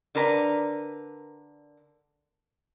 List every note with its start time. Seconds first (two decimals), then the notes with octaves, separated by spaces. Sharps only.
0.15 D3 D4 A#4 B4 A#5